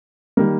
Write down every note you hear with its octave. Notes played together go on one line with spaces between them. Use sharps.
D#3 G3 A#3